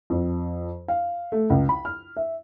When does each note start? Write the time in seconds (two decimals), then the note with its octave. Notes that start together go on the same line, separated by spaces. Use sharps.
0.10 F2
0.88 F5
1.32 A3
1.50 C#2
1.69 B5
1.85 F6
2.17 E5